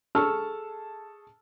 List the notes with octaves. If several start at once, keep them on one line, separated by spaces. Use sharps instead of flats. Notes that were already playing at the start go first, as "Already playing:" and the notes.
G#4 A4 A5 C#6 E6 F6